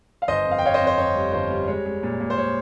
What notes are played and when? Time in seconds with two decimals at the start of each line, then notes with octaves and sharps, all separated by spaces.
0.22 F5
0.28 G1 C5 D#5
0.45 F2
0.51 F5
0.59 G5
0.63 G1 C#5 F5
0.74 C5 D#5
0.81 F2
0.87 C5
0.98 F2 C#5
1.15 G3
1.32 G1 C5
1.50 G3
1.67 G#3 C#5
1.86 G#3
2.03 A#2
2.20 A#2
2.30 C5
2.37 A#2 C#5